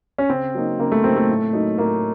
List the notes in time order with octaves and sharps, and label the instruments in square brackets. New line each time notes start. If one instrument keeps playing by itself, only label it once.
[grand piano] C#4
[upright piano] C#3 [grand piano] C4
[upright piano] F#3 A#3 D#4
[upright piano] C#3 [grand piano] A#3
[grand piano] A3
[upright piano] F#3 A#3 D#4 [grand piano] C4
[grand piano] A3
[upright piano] A2
F#3 A#3 D#4
[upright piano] A2 [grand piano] A#3